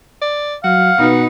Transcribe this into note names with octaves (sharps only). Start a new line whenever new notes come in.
D5
F#3 F5 F#5
B2 D#4 B4